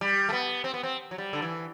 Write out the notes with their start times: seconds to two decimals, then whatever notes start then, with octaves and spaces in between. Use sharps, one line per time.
0.01 G3
0.29 A3
0.33 B3
0.64 C4
0.74 B3
0.83 C4
1.11 F#3
1.18 G3
1.33 D3
1.42 E3